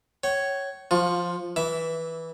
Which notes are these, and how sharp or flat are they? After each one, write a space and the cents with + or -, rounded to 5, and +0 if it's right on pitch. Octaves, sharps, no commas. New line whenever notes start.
C#5 +0 G5 -45
F3 +0 F4 +25 C#6 +0
E3 -15 E5 +0 D6 -30